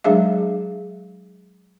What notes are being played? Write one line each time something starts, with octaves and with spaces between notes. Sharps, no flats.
F#3 G#3 D4 G#4 E5 F5